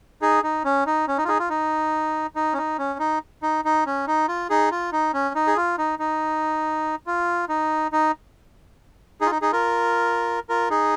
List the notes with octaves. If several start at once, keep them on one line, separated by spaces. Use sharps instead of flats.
D#4 G#4
D#4
C#4
D#4
C#4
D#4
F4
D#4 G#4
F4
D#4
D#4
C#4
D#4
C#4
D#4
D#4
D#4
C#4
D#4
F4
D#4 G#4
F4
D#4
C#4
D#4
G#4
F4
D#4
D#4
F4
D#4
D#4
D#4 G#4
F4
D#4
D#4 G#4
F4 A#4
F4 A#4
D#4 G#4